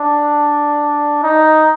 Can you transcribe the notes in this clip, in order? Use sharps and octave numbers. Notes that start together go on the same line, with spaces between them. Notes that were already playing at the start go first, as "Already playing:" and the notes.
Already playing: D4
D#4